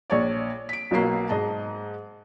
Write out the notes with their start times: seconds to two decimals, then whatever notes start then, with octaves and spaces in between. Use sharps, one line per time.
0.10 A#1 C#5 D5
0.69 B6 D7
0.91 B1 B2 F#3 A#3 C7
1.29 G#2 D#5 A5